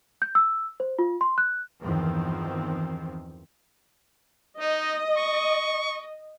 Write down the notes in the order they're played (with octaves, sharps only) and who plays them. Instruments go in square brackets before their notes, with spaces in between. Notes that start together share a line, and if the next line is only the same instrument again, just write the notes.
[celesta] G6
E6
C5
F4
C6
F#6
[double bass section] E2 G2 D#3 F3 C4
[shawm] D#4 [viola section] D#5
[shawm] C#6